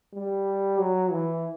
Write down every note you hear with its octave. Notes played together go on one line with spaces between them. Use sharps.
G3
F#3
E3